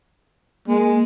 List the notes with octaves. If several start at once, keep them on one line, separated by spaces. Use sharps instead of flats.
G#3 A#3